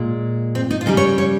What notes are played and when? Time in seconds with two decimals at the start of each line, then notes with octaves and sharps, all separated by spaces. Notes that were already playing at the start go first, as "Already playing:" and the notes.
Already playing: A#2 G#3
0.55 C4
0.71 D#4
0.81 F4
0.86 C#3 G3 D#4
0.97 C#5
1.18 C#5